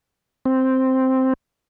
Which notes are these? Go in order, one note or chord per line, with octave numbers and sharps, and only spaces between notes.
C4